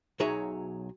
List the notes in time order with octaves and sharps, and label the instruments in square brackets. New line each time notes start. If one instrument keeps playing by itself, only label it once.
[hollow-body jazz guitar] B1 F#3 D#4 G#4 C#5 E5